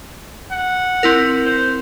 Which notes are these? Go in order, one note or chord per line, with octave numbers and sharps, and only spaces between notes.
F#5
C4 E4 A#4
C5